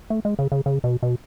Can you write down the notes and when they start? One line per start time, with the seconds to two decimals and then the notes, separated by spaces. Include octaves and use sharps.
0.10 A3
0.25 G#3
0.39 C#3
0.52 C#3
0.66 C#3
0.84 B2
1.03 B2